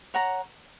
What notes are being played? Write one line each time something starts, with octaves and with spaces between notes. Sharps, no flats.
C#5 F#5 A#5